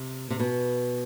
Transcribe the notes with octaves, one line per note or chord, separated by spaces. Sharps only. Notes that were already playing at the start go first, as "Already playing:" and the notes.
Already playing: C3
C3
B2